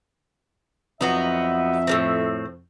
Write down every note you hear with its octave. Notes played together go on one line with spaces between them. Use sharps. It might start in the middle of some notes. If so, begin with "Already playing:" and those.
F2 F#3 B3 D#4 E5
A2 A#3 C4